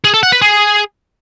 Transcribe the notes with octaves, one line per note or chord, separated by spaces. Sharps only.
G#4
A4
F#5
B4
G#4